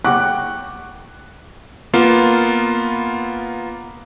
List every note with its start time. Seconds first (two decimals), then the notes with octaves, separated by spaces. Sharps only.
0.05 F#5 G5 C#6 D6 F#6
1.94 A#3 B3 F4